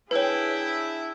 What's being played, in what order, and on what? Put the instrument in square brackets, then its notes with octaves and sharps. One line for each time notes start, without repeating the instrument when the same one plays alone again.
[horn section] D4 E4 [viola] G#4 G5 [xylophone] B4 C#5